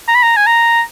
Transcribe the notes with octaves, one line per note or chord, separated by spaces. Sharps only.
A#5
B5
A#5
G#5
A#5